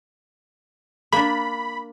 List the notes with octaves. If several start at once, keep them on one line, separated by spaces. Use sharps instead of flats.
A#3 D4 B5